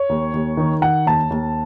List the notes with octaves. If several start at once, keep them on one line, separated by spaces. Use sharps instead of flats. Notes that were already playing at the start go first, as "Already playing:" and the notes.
Already playing: C#5
D#2
D#2
D#3
D#3 F#5
D#2 A5
D#2